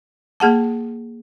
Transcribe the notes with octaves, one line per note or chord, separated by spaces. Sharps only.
A#3 G#4 F#5 A5